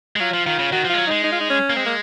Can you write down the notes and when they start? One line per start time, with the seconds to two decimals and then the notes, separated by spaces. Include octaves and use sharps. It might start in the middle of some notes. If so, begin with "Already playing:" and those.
0.16 G#3
0.20 F#3 F4
0.34 F3
0.46 D#3 F4
0.59 C#3
0.72 D#3 F#4
0.85 F3
0.90 G#3 F4
0.98 F#3
1.07 G#3 D#4
1.24 D#4
1.32 F4
1.40 D#4
1.50 C#4
1.70 A#3
1.76 G#3 C4
1.86 A#3